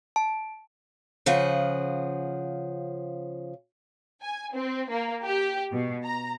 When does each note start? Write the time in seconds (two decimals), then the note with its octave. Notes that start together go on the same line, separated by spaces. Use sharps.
0.16 A5
1.26 C#3 F3 G#4 F#5
4.22 G#5
4.54 C4
4.90 A#3
5.24 G4
5.72 B2
6.04 A#5